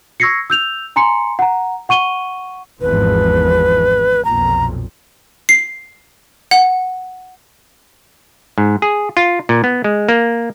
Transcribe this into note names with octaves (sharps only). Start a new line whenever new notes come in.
C#6 E6 G#6 A#6 C7 C#7
E6 G6 F7
G#5 A#5 C6 C#7
F#5 A#5
F#5 C#6 D#7 G7
G#1 E2 F3 B4
B1 F2 A#2 A#5
C7
F#5
G#2
G#4
F4
A#2
B3
G#3
A#3